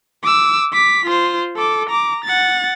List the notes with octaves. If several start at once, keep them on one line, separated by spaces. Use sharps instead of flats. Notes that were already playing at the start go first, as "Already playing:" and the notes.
D6 E6
D6 B6
F4 C5
A4 D6
A#5 D6
F#5 A6